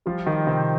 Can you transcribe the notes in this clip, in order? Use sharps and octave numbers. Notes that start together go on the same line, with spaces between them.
F3 G3 F4
D#3 G3 D#4
C3 C4